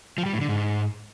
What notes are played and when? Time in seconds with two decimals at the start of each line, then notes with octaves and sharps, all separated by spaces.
0.18 F3
0.26 G3
0.33 A2
0.41 D3
0.49 G#2